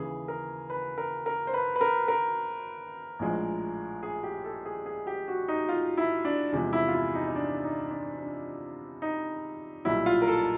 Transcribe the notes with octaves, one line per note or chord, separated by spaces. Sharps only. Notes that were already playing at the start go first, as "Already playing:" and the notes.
Already playing: D#2 C#3 E3 G#4
A#4
B4
A#4
A#4
C5
B4
B4
A#4
A#4
A#1 A2 F3 G#3
G#4
G4
A4
G#4
G#4
G4
F#4
D#4
F4
E4
D4
E2 C3 F3 G#3
E4
F4
E4
D#4
D#4
D4
D#4
D4
D4
D#4
B1 A#2 G3 E4
F4
A#4
A4